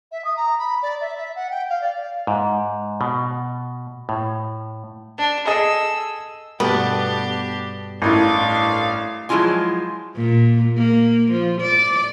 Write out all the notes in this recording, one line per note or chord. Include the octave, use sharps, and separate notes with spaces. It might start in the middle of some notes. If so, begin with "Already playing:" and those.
E5
D#6
A#5
B5
D5
E5
E5
F#5
G5
F5
D5
F5
G#2
B2
A2
D4
G#4 A4 D#5 E6
G2 B2 A3 B3 D4 G4
A1 A2 D4 A4 A#4 D#5 F5
F3 F#3 G#3 E4 F4 G#5
A#2
A#3
F3
D5